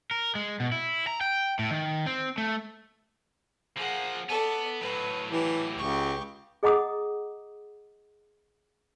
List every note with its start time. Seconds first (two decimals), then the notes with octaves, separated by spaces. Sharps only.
0.11 A#4
0.35 G#3
0.60 B2
0.72 E4
1.07 A#5
1.21 G5
1.59 A2
1.71 D#3
2.06 C4
2.38 A3
3.77 F3 A#3 G#4 F#5
4.29 B3 A4 D5
4.81 A2 F#3 B4
5.31 E3 G4
5.78 C#2 G4 C#6
6.63 G#4 D#5 F#5 A#5 D6 D#6